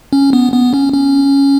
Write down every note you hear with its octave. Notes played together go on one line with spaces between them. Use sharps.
C#4
B3
B3
C#4
C#4